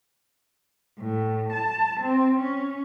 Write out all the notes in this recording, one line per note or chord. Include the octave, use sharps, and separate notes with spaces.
A2
A5
C4
C#4